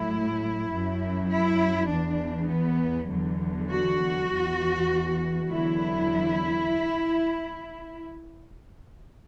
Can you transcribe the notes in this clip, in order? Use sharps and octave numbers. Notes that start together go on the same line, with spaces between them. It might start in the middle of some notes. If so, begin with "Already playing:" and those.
Already playing: A2 F#3 E4
F#2 F#3
E4
E2 E3 D4
B3
E2 D3 F#3
F#4
E2 E3
E2 D3 F#3 E4